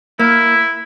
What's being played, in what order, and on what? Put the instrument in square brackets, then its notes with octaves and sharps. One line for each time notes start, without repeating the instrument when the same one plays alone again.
[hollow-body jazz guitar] A#3 [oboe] E4